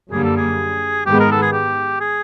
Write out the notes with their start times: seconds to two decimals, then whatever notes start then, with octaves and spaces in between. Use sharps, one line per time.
0.11 F#2 D3 G3 A#3 G#4
0.24 A4
0.37 G#4
1.06 G#2 D#3 G#3 B3 G4
1.20 A#4
1.31 A4
1.42 G#4
1.53 G4
2.00 G#4